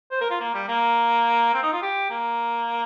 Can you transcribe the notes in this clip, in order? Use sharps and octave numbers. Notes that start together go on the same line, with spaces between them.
C5
A#4
F4
A#3
G3
A#3
C4
D#4
F4
G4
A#3